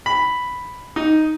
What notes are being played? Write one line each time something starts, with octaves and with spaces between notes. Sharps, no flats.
B5
D#4